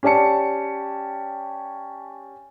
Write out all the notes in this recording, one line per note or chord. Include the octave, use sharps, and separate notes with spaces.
C#4 G4 D5 A5 C#7